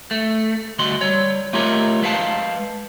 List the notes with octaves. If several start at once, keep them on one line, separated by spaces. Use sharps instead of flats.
A3
D2 G3 F#4 D#5 C6
G3 C#5
A3 F4 G4 A#4 C#5 D#5
G#3 B4 F5 A5